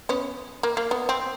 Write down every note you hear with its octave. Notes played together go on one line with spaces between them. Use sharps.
B3 C#4
A#3
A#3
B3
C4